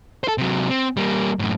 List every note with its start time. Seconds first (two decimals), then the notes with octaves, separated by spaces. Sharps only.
0.24 A4 C5
0.38 C3 F#3
0.69 C4
0.97 G3 A#3
1.39 F#2 A2